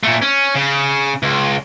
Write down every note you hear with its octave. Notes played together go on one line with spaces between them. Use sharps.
A#2 A3
C#4
C#3
C#2